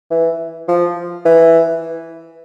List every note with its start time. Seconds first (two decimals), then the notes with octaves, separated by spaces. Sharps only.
0.11 E3
0.68 F3
1.25 E3